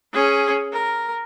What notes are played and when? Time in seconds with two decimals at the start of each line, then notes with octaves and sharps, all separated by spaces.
0.13 C#4 G#4
0.72 A#4